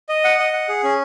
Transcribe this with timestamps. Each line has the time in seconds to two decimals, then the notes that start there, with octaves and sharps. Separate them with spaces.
0.09 D#5
0.24 F#5
0.39 D#5
0.53 F#5
0.69 G#4
0.83 C#4